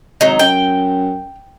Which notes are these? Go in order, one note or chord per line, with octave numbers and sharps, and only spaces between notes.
G#1 F#3 D#4
F#2 G5